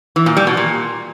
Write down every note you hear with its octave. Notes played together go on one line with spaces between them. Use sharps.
E3
A#2
G3
B2
A#2